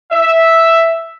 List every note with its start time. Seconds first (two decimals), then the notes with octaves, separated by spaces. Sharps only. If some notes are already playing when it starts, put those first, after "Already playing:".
0.12 E5